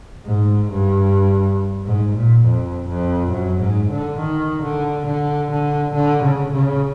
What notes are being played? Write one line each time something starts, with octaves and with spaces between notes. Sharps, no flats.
G#2
G2
G#2
A#2
F2
F2
F#2
G#2
D3
D#3
D3
D3
D3
D3
C#3
C#3